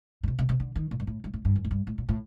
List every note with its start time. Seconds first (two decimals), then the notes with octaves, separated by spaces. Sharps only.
0.23 A#2
0.28 C3
0.39 C3
0.49 C3
0.60 D3
0.76 D#3
0.91 A#2
1.00 G2
1.07 A2
1.24 G2
1.33 A2
1.45 G2
1.56 F#2
1.65 A2
1.71 G2
1.87 A2
1.98 A#2
2.09 A2